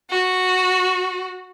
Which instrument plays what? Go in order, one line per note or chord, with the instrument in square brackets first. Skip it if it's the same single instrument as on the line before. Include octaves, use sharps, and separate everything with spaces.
[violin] F#4